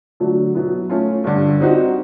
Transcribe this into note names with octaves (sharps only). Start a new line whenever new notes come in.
D3 F#3 A3
B2 F#3 B3 E4
A3 C#4 F4
G2 D3 G3
G3 C4 D#4 F#4